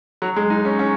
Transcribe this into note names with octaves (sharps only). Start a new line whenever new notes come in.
F#3
G#3
D#4
C#4
C#4